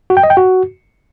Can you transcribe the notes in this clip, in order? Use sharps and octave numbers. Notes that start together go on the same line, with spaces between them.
F#4
G5
D#5
G5
F#4